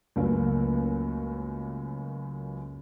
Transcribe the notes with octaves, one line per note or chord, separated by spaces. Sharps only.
C#2 F#2 A3 A#3